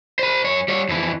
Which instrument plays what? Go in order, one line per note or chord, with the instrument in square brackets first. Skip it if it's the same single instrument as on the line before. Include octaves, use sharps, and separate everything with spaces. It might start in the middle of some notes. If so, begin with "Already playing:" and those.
[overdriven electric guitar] C5 B5
F#2 C#5
G3 C#5
F2 E3